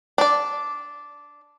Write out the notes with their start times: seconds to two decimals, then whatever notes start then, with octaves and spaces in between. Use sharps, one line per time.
0.18 D4 D5